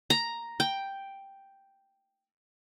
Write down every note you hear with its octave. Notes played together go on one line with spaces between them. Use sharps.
A#5
G5